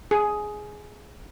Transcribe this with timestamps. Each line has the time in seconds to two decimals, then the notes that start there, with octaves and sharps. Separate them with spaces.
0.11 G#4